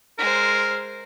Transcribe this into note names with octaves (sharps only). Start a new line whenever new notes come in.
G#3 A#4 C5